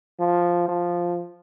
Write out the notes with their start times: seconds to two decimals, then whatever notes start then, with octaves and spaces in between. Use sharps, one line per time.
0.20 F3
0.68 F3